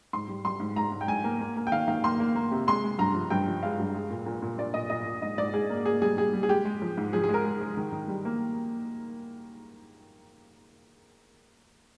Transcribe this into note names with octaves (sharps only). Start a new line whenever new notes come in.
G#2 C6
G3
G3 C6
G#2
G#2 A#5
G#2
G5
G#2 G#5
A#3
A#3
A#3
G5
D#3 F5
D#3 F5
A#3 C6
A#3
A#3
C3
G#3 C6
G#3
G2 A#5
F3
G2 G5
F3
G#3 F5
G2
G#3
A#2
A#2
A#2
A#2 D5
A#2 D#5
A#2 D#5
A#2
G#2 D#5
G#2 D5
G#2 G#4
A#3
A#3 G#4
G3 G#4
G3 G#4
G3
G#4
G#3 G4
G#3
F3
G#2
F3 G#4
G#4
G#3 A#4
G#3
G#3
D#3
D#3
G3
A#3